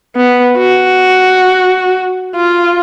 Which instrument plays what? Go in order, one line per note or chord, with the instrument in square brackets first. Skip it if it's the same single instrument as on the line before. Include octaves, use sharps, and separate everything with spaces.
[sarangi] B3
F#4
F4